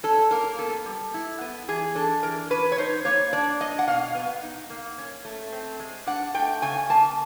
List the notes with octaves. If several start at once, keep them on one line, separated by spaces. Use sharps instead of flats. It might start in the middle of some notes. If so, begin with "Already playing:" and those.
C#4 A4
A#3 A#4
B3 A4
G3
E4
B3
E3 G#4
D4 A4
E3 A#4
C#4 B4
C#5
D#4 C5
A#3 C#5
D4 D5
A#3 D#5
F#5
B2 F5
B3
D#4
A#3
C#4
A3
C4
G#3
D4 F#5
A3 G5
C#3 G#5
A#3 A5